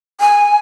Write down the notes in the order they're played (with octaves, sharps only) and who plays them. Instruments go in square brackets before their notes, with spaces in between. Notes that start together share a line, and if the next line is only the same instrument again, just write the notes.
[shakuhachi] G#5